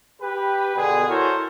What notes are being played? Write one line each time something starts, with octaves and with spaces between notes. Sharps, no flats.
G4 B4
B2 D3 G#4
E4 F#4 A4 A#4 C5 C#5